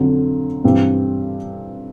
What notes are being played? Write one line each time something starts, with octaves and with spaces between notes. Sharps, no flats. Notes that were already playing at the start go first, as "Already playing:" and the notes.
Already playing: F2 D3 F#3
G2 E3 G3 C4